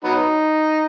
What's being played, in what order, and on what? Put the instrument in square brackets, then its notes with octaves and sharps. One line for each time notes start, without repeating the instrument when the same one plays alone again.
[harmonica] F#3 B3 D#4